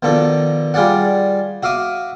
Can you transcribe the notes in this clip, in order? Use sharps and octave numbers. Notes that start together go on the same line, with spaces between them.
B2 D#3 F3 D4 A4
G3 F4 G#4 D5 F#5
F#4 E5 F5 D6 D#6